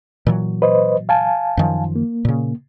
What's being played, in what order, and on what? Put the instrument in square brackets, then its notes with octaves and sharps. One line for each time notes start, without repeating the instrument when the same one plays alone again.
[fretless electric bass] A#2 E3 F#3
[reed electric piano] B4 C5 D#5
F5 G#5 A5
[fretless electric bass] F#2 D#3 F3
[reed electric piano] A#3
[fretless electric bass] A#2 C#3